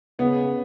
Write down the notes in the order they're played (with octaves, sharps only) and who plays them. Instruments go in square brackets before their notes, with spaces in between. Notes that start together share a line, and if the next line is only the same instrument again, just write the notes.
[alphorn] C#3 [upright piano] B3